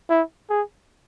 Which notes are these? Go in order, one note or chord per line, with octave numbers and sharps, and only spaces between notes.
E4
G#4